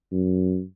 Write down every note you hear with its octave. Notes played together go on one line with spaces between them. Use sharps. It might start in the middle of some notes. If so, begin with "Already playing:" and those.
F#2